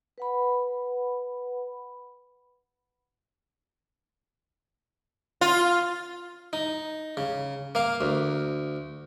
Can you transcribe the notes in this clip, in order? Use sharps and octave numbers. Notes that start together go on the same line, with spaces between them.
B4 F#5 B5
F4
D#4
C#3
A#3 F5
D2